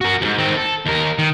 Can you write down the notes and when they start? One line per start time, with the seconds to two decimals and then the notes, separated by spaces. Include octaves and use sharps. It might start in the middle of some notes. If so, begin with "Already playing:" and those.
0.01 F#4 A#4
0.21 D#2 G#2
0.38 D#3 C4
0.56 A4
0.85 D#2 A#4
1.18 D#3